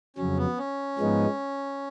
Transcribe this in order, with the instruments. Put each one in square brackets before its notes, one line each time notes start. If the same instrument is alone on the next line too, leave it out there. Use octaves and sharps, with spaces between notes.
[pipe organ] F2 C#3 F#3 [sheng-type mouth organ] C#4
[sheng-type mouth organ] B3
C#4
[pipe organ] G#2 F3 G#3 B3 D#4